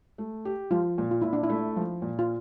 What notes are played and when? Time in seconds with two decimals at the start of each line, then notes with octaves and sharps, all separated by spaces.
0.18 A3
0.45 G4
0.71 F3 F4
0.98 A#2
1.11 F4
1.22 A#2 E4
1.33 D4
1.43 E4
1.50 A3
1.76 F3
2.02 A#2
2.19 F4